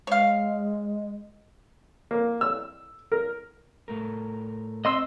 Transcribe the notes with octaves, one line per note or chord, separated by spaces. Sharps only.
G#3 C#5 F5
A#3
E6
A#4
A2 A3 A#4
C4 D#5 C6 E6